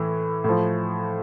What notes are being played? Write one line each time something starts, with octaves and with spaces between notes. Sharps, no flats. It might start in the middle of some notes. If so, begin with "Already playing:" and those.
Already playing: A2 E3
A2 F3